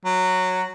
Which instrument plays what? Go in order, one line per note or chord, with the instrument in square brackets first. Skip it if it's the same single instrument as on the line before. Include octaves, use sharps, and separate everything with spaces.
[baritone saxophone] F#3